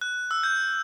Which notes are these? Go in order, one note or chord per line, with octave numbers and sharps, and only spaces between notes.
F#6
E6
G6